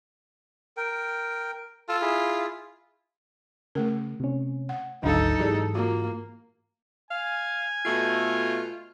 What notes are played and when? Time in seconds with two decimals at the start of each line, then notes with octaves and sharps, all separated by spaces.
0.77 A#4 G5
1.89 F4 A4 A5
2.01 E4 G#4
3.75 C#3 A3 A#4
4.20 C3 C#4
4.69 F#5
5.03 G#1 D2 F#3 D4 D#4 A4 F5
5.39 G#2 E3 G4 G#4 D5
5.75 A#3 F4 F#4
7.11 F5 G#5
7.85 B2 A3 F4